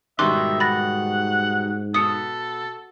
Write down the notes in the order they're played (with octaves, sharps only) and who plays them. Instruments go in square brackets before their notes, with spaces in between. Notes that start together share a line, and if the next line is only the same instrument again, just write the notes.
[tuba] G#2 [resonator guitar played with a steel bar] B2 D#3 G3 [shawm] E5 [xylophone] C6 D6 F#6
[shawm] F#5 [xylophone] B5 A6 A#6
[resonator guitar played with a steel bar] B2 [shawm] A4 [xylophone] D#6 C#7